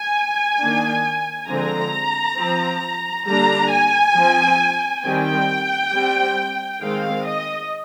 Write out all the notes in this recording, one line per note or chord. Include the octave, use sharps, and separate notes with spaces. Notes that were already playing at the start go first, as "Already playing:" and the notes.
Already playing: G#5
D#3 A#3 D4
D3 F3 G#3 C4 A#5
F3 C4
D3 G3 A#3 D4 A#5
G#5
F3 C4
D#3 G3 C4 G5
G3 C4
D#3 G#3 C4 F5
D#5